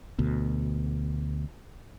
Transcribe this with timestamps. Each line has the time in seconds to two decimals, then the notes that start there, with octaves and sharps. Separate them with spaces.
0.19 D2 B2